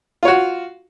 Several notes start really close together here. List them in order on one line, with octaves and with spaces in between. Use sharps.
F4 C#5 F#4